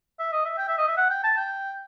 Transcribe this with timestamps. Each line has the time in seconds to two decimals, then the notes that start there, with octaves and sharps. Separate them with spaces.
0.19 E5
0.32 D#5
0.45 E5
0.58 G5
0.68 E5
0.78 D#5
0.88 E5
0.97 F#5
1.10 G5
1.24 A5
1.37 G5